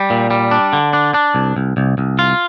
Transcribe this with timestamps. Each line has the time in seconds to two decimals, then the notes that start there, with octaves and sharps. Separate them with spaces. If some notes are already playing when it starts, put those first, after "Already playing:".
Already playing: G3
0.10 A#2
0.31 G3
0.51 D4
0.73 D3
0.93 D4
1.14 D4
1.35 C2
1.56 C2
1.77 C2
1.98 C2
2.19 F4